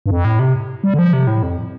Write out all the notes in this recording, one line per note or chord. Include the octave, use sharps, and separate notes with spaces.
G2
F2
A2
C3
G3
D3
F3
C3
A2
F2